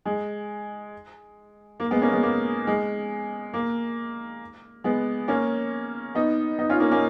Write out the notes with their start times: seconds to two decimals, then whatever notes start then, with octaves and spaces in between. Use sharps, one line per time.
0.06 G#3
1.80 A#3
1.91 G#3 B3
2.02 A#3 C#4
2.13 G#3 B3
2.23 A#3
2.67 G#3
3.54 A#3
4.84 G#3 B3
5.28 A#3 C#4
6.15 B3 D#4
6.59 B3 D#4
6.69 C#4 F4
6.80 A#3 C#4
6.91 A#3 C#4